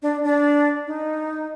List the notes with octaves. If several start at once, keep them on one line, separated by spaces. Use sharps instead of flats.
D4
D4
D#4